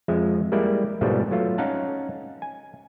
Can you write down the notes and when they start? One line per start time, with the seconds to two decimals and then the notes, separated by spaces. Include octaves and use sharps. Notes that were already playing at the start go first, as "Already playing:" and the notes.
0.08 F2 F3 G#3 E5
0.52 G3 G#3 A#3 E4 D5
1.01 G#2 B2 F3 G3 A3
1.31 F#3 A3 F4
1.58 C#4 D#4 F5 F#5 A5
2.42 G#5